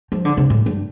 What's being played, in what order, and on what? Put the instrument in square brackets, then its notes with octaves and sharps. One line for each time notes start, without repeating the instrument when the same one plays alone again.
[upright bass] F3
D3
C3
A2
G2